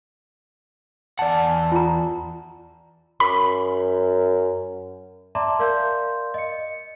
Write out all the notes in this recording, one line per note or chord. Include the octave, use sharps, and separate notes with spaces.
E2 D5 F#5 A5
F4 A#5
F#2 B5
D5 E5 A5 A#5 C6 D6
A#4 D5 F5 C6 G6
D#5 C#7